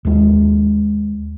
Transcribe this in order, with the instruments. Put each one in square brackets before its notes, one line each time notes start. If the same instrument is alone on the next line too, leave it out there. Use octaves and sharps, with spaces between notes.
[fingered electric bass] D#2 G#3